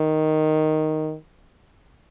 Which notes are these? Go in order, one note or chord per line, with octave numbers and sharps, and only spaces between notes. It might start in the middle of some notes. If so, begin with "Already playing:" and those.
Already playing: D#3